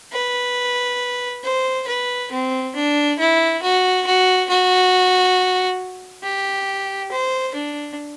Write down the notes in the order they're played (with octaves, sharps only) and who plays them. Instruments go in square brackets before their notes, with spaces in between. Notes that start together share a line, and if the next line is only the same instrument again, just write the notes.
[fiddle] B4
C5
B4
C4
D4
E4
F#4
F#4
F#4
G4
C5
D4